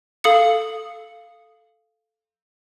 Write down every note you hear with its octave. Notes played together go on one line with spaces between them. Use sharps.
A4 F5 D#6 C#7